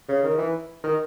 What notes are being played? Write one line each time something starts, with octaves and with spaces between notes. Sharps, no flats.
C#3
D#3
E3
D#3